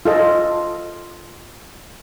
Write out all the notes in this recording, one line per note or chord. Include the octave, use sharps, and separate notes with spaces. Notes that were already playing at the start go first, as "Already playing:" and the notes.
F4 A4 D#5